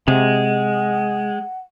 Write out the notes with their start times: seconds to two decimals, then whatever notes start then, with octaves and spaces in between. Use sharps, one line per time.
0.08 C3 G#3 F#5